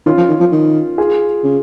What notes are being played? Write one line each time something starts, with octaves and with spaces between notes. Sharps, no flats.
D#3 C#4 F4
F3
D#3
F3
D#3
F4 G#4
C#3